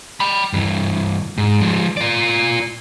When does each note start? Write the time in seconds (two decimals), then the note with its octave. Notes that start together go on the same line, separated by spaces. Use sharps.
0.20 G5 B5
0.53 G2 E3
1.38 G#2
1.61 F3 G#3
1.97 F4 D5